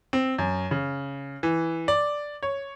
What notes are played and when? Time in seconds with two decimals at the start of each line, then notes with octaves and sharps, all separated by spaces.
0.13 C4
0.38 F#2
0.71 C#3
1.43 E3
1.88 D5
2.43 C#5